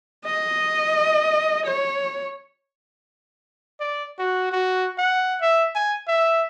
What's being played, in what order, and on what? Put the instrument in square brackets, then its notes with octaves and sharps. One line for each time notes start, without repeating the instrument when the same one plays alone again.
[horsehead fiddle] D#5
C#5
[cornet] D5
F#4
F#4
F#5
E5
G#5
E5